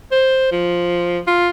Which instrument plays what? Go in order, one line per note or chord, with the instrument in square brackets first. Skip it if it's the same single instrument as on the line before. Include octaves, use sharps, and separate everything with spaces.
[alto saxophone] C5
F3
F4